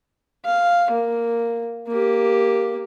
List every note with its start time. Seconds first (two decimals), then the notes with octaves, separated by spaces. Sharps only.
0.45 F5
0.91 A#3
1.88 A#3 G4